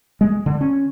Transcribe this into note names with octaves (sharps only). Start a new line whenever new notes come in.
G#3
D3
C#4